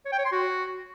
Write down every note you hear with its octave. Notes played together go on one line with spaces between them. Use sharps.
C#5
G5
C#5
C6
F#4